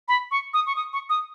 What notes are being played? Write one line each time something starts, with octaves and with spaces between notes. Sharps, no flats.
B5
C#6
D#6
C#6
D#6
C#6
D#6